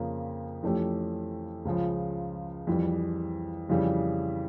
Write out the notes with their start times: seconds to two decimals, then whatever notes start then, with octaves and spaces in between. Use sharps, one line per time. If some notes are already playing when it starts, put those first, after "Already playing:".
Already playing: F2 C#3 F3 A#3
0.63 F2 E3 A3 C#4 G4
1.65 C#2 C#3 F3
2.67 F2 E3 G3
3.69 F2 C#3 E3 G3